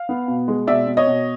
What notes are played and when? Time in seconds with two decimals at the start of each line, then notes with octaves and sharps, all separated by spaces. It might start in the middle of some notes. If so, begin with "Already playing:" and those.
Already playing: F5
0.09 B3
0.28 B2
0.48 G#3
0.67 B2 D5 E5
0.87 B2
0.97 C#5 D#5
1.07 B2